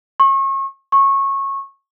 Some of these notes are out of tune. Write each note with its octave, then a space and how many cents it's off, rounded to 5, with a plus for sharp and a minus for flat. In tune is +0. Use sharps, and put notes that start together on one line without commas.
C#6 -35
C#6 -20